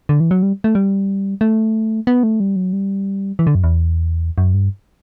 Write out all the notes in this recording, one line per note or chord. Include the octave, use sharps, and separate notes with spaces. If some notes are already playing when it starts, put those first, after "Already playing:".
D3
E3
F#3
G3
A3
G3
A3
B3
A3
G3
F#3
G3
E3
D3
F#2
E2
F#2
G2